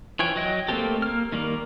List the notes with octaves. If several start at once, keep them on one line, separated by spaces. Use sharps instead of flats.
E3 F3 C#5 G5
F#3 D#5 G5
A3 A#3 C4 G4 A4
A#3 F6
D#3 G3 A#3